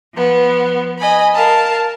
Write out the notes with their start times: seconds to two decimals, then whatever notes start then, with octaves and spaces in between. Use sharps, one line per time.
0.15 F3 B3
0.98 D#5 G#5 B5
1.34 A#4 F5 A5